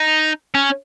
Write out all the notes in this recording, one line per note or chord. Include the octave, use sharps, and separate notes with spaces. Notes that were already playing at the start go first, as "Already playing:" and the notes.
Already playing: D#4
C#4